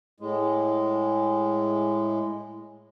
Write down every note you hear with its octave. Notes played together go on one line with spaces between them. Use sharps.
A2 G#3